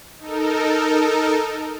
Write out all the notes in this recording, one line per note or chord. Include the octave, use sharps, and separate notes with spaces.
D#4 A4 A#4